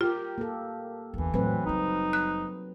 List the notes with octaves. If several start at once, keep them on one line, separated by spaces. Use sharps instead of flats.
F4 G4 A#4
A#3 A4
G1 E2 E3
F2 A2 F#3 C4 B4
F#1 G3 D#4
F#6